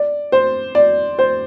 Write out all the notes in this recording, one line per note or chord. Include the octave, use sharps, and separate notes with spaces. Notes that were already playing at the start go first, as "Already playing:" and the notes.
Already playing: D5
C5
D5
C5